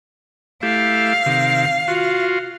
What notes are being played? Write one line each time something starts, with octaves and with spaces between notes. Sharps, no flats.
A3 E4 G4 F5
C3 D#3
F4 F#4